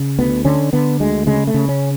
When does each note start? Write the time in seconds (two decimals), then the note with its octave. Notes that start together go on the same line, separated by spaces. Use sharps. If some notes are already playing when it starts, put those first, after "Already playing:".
Already playing: C#3
0.19 D2 B3
0.45 D3 C#4
0.73 D3 B3
1.00 D2 G#3
1.27 C#3 G#3
1.47 A3
1.54 C#3
1.69 C#4